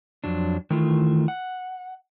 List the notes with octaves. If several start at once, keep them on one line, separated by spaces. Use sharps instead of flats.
F2 F#3 D4
D#3 E3 A3 F4
F#5